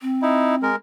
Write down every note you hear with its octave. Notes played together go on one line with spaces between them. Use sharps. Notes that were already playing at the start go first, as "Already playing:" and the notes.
C4
D#4 E4
G#3 A#4